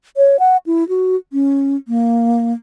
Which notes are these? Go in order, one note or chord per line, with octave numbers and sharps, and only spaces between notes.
C#5
F#5
E4
F#4
C#4
A#3